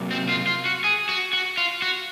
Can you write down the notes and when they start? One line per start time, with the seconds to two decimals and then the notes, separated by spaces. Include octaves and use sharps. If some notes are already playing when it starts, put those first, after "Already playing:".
Already playing: C3 F#3 A#3
0.11 C4
0.29 F4
0.47 F4
0.66 F#4
0.84 G#4
1.09 F#4
1.33 F#4
1.57 F4
1.82 F#4